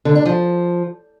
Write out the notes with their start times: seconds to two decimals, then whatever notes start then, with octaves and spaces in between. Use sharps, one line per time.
0.05 D3
0.15 D4
0.26 F3